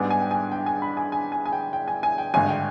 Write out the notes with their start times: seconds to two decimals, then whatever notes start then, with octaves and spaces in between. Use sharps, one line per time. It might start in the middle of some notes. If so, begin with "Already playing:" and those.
Already playing: G#2 G3 B3 D4 G#5
0.10 G#5
0.22 G5
0.31 G#5
0.52 G5
0.66 G#5
0.82 B5
0.97 G#5
1.12 G#5
1.32 G#5
1.46 G#5
1.53 G5
1.73 G5
1.88 G#5
2.03 G#5
2.18 G5
2.34 G#1 G2 D3 G#3 G#5
2.49 G5